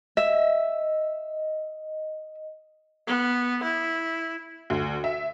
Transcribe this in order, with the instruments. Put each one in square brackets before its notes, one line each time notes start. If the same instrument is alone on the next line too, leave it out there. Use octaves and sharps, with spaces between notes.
[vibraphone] D#5 [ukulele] E5
[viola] B3
E4
[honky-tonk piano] D2
E5